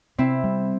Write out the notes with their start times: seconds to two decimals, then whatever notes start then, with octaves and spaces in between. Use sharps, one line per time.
0.18 C3 C4 E4
0.44 G3